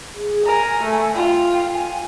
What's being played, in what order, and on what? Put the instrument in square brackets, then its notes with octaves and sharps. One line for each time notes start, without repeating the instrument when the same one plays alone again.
[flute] G#4
[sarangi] A#4 [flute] G#5
[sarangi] A3
[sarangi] F4 [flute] G5
[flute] G#5